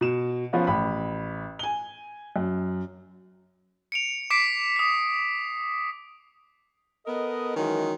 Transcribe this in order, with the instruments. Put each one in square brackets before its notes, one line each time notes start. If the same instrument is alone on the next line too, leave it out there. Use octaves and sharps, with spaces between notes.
[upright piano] B2 E7
F3 B3 C#4 F4
A1 B5
G#5 G7
F#2
[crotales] C#7 D7 F7
D6 B6 C7 D7
D#6 B6
[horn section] B3 A4 A#4 D#5
D#3 E3 F#3 G#3 C#4